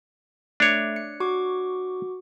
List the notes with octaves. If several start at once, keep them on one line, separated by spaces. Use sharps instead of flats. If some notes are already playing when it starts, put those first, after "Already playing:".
A3 D4 C#5
C#7
F#4 C#6 D6